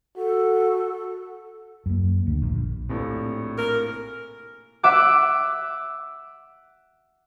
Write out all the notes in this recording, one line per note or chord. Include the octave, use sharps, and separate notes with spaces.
F#4 A4
F#2 A#3
D2
A#1
A#1 A2 C3
A#4
E5 F#5 D6 F#6